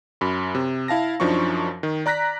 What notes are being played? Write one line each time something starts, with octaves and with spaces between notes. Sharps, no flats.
F#2 B5
C3
E4 F5 A5 A#6
F#2 F3 D4 D#4 C#6
D#3
D5 A#5 F#6 A#6 B6